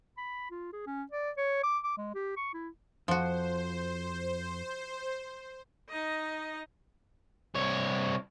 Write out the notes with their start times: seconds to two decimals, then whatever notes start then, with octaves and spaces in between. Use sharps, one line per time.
0.18 B5
0.51 F4
0.73 G#4
0.86 C#4
1.11 D5
1.37 C#5
1.63 D6
1.84 D6
1.97 G#3
2.14 G4
2.37 C#6
2.54 E4
3.08 F2 F3 F#4 C5
5.89 D#4 D#5
7.55 C2 C#5